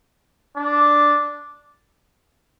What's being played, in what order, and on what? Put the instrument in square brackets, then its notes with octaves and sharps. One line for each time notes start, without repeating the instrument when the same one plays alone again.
[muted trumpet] D4